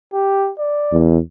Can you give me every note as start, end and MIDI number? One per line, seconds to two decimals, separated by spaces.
0.13 0.51 67
0.59 1.02 74
0.92 1.18 40